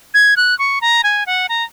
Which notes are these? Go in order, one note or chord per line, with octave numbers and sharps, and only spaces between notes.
G#6
F#6
C#6
A#5
G#5
F#5
A#5